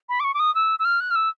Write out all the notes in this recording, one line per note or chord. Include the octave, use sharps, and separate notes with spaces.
B5
D6
C#6
D6
D#6
E6
E6
F6
F#6
F6
E6